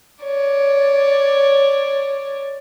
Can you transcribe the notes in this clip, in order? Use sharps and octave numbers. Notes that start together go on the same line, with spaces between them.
C#5 D5